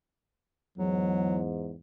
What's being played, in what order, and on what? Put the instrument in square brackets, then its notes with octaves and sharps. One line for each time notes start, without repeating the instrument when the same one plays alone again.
[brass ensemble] E2 G#2 [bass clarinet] F#3